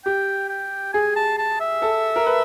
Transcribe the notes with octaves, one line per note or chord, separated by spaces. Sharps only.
G4 G5
G5
G#4 G#5
A5
A5
E5
A4
A#4
B4